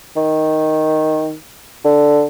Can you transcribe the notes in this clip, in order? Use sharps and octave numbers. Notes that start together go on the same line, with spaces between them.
D#3
D3